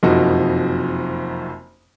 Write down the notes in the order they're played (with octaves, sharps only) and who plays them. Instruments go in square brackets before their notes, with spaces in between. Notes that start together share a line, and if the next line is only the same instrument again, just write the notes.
[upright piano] F#1 F2 C3 D#4 F#4